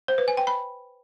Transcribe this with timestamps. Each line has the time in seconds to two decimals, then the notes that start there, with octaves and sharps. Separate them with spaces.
0.08 C5
0.18 B4
0.28 G#5
0.37 G5
0.47 B5